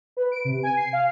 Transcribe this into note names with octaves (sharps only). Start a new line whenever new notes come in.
B4
D7
C3
G#5
C7
F5